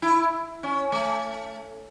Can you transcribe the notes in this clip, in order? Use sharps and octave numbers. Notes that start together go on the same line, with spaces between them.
E4
C#4
A3